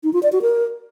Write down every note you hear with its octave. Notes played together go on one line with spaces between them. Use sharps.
D#4
F4
D5
F#4
A#4